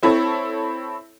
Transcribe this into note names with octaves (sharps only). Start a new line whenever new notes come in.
C4 E4 A4 C#5